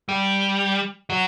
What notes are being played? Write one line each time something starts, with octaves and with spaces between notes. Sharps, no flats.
G3
F#3